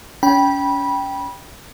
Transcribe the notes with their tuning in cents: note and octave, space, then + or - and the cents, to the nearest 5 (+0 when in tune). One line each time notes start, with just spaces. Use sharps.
C#4 +30 G5 +0 B5 -20